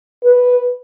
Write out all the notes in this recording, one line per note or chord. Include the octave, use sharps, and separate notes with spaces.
B4